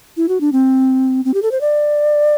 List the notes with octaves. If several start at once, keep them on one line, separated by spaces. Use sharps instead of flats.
E4
F#4
D4
C4
C4
G4
A4
C5
D5